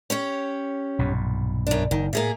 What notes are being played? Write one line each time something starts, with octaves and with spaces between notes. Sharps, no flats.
C#4 G4 C#5
B1 G2 A#2
F#2 D4
F#1 D#3
A2 A#3 G#4 E5